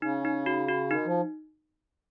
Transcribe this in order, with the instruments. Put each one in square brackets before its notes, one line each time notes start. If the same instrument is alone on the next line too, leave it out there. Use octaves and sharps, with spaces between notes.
[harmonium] C#3 [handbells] D#4
[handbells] D#4
F#4
F#4
[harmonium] D#3 [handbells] D#4
[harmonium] F3